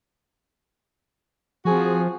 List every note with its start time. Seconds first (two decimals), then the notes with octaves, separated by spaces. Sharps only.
1.65 F3 C4 F#4 G#4